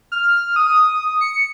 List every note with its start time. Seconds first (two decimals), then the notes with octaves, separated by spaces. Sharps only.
0.12 F6
0.56 D#6
1.21 C#7